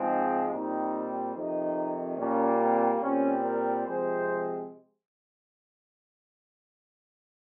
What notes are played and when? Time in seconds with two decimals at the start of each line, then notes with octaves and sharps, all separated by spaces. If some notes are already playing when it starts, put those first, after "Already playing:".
Already playing: G#2 F3 G#3 C4 D#4
0.51 A#2 G3 C4 D#4
1.35 F2 C3 D#3 D#4
2.18 A#2 G3 A#3 C#4
2.60 C4
3.01 A#2 G3 C4 C#4
3.44 A#4
3.85 C3 F3 G#3 C4 C5